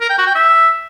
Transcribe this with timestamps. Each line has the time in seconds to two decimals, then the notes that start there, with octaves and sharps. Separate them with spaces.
0.01 A#4
0.09 G5
0.18 F#4
0.27 G5
0.35 E5